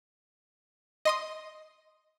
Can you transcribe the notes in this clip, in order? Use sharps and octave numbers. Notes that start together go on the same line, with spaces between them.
D#5 C6 D#6